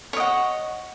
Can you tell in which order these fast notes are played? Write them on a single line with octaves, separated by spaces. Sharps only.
C#5 D#5 F#5